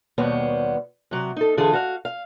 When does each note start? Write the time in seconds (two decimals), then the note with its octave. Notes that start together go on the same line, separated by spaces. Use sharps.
0.18 D#2 B2 G3 B3 C5 C#5
1.11 C3 F#3
1.36 D#4 A4
1.57 D3 E3 F4 G#4 A4
1.73 F#4 F5
2.05 F5